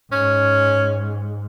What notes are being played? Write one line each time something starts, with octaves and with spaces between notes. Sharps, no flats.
G#2 C#4